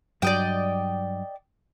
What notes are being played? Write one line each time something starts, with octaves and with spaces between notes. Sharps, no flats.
G2 F#3 D5 D#5 G5